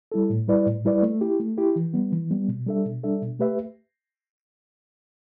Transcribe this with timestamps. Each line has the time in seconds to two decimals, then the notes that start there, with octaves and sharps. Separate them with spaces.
0.12 G3 E4 A4
0.30 A2
0.48 G3 E4 B4 D5
0.66 A2
0.85 G3 E4 B4 D5
1.03 A3
1.21 E4 G4
1.39 A3
1.58 E4 G4
1.76 E3
1.94 G3 B3
2.12 E3
2.31 G3 B3
2.48 B2
2.66 G3 D4 A4 E5
2.85 B2
3.04 G3 D4 A4 E5
3.22 B2
3.40 A3 G4 B4 E5